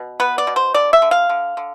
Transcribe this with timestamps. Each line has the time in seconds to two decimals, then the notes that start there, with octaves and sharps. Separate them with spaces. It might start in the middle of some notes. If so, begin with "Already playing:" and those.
Already playing: B2
0.20 B3 B4
0.38 D5
0.47 B2
0.56 C5
0.74 D3 D5
0.93 E5
1.02 D3
1.11 F5
1.29 D3
1.57 D3